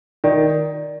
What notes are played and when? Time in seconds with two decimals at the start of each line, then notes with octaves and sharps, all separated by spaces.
0.24 D#3 D5